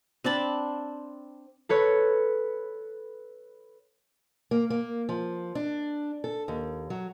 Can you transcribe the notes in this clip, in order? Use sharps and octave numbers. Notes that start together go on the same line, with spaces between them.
C4 D4 A5 B5
A4 B4 C#5
A#3
A#3
F3
D4
A4
D#2
F#3